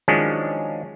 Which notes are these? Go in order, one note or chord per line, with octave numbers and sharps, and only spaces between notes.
D#3 F3 F#3 G#3 C#4 D4